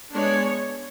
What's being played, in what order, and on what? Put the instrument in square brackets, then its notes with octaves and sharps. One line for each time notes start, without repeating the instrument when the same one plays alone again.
[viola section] G#3 B3 D4 C#5